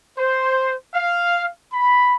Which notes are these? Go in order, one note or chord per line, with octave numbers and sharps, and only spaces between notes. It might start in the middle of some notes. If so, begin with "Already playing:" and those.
C5
F5
B5